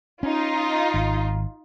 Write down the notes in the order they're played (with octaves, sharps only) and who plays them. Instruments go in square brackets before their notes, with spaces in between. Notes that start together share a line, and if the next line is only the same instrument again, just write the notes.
[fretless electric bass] C#4 [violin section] D#4 F4
[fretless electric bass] G#1